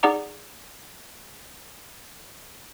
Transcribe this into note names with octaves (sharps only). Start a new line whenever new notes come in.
D#4 G#4 D5 F#5 A#5 D6